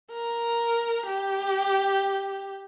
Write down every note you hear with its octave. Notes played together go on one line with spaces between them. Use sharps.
A#4
G4